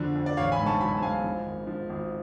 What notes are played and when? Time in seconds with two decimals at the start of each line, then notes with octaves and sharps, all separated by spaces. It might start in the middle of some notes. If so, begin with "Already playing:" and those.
Already playing: F2 D3 F3 D4 F#4
0.16 F2
0.26 D5
0.37 A1 C#5 F5
0.52 G#5 B5
0.59 G#2
0.66 A5 C#6
0.81 F#3 G#5 B5
0.97 A5
1.02 G#2 F5 G#5
1.24 F3
1.46 G#1
1.67 F3
1.90 G#1